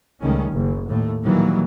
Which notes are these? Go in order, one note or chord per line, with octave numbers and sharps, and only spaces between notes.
C#2 D#3 G3 A3 C#4
F#1
D#2 A2 A3
A#2 D#3 E3 F#3 G3 A#3